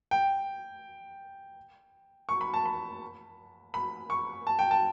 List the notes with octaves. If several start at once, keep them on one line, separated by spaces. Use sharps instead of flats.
G5
C#6
B5
A5
B5
B5
C#6
A5
G5
A5